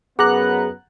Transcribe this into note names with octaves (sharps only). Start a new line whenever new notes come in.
F#2 B3 G#4 F#5 A#5 D6 F#6